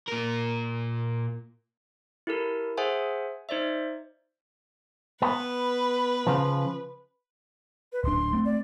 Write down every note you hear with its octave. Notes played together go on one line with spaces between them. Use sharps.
A#2 A#4
E4 G4 A4 A#4
G#4 C5 E5 F#5 G#5
D#4 C5 D5 E5
B3 B4
C#3 F3
B4
D1 D4 C6
A3 C4
D5